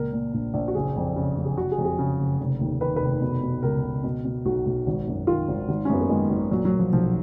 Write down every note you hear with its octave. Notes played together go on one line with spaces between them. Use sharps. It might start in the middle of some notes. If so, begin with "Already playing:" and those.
Already playing: C#2 A#2 A#4
A#2
A#1
A#1
F#4
F#1 G#4
F2
C#3
F#1
G#4
F#1 F#4
G#4
F2
G#4
C#3
F#1
F1
D#2
D#3 B4
F1 B4
B2
B2
C#2 A#4
C#2
B2
B2
B1 F#4
B1
G#1
F#2
D#3 F4
G#1
G#1
C#4
F#2 B3
A#3
D#3 G#3
G#1
A#2 F#3
F#3
A#2
F3
B1 F3